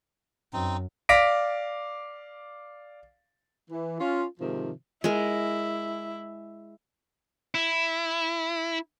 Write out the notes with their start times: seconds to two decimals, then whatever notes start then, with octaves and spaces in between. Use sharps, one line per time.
0.53 F#2 C4 D#4
1.09 D5 F5 D6 A#6 B6 D7
3.70 E3
3.99 C#4 F4
4.40 G#2 C3 D#3 F3
5.04 G#3 E4 A#4
7.55 E4